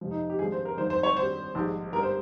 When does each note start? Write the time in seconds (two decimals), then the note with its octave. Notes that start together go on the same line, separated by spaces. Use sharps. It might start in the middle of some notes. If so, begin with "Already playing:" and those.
0.01 F2 C3 F3
0.11 D#4
0.30 G4
0.39 G#1 G2 F3 G#4
0.52 C5
0.65 A#4
0.78 G1 F2 D#3 C5
0.90 C5
1.03 C#5
1.17 G#1 G2 G3 C5
1.55 A#1 G#2 D#3 G3
1.93 G1 G2 G3 A#4
2.03 C5